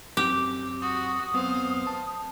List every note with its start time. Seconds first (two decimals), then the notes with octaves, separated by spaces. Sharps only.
0.17 F#2 C4 G4
0.81 F#4 D#6
1.34 F#2 B3 C4 C5 F5
1.87 A5